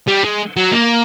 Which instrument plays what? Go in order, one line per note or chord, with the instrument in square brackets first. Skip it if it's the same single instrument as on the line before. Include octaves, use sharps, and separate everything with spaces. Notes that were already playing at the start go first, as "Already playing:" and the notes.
[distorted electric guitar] G3
G#3
F#3
A#3